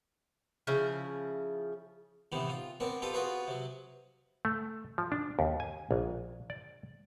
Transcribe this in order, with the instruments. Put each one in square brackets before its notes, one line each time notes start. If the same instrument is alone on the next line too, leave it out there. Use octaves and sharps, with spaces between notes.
[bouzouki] C#3 F3 E4
[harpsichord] A2 C3 D#3 E3 B3
F4
B3 C4 D4 A#4
F4 G4 A4 B4 F5
B3 F4 F#4 G#4 B4 C5
C3 F#3
[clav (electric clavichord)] A3
F3
D4
D#2
G#5
A#1
D5